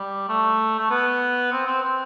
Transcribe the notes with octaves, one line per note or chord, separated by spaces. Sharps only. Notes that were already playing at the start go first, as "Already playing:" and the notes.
Already playing: G3
A3
A3
B3
C4
C4
C4